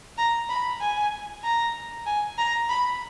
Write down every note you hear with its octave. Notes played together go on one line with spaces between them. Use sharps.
A#5
B5
G#5
A#5
G#5
A#5
B5